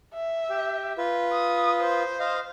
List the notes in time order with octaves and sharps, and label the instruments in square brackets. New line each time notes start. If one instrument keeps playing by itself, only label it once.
[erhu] E5
[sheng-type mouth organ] G4
F4 B4
[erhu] D#6
C5
[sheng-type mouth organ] D#5 F5